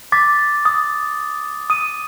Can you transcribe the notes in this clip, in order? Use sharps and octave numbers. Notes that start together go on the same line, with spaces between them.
D6 A6 B6
D#6
D#6 D#7